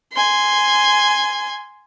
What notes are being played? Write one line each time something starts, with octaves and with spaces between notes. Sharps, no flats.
G#5 C6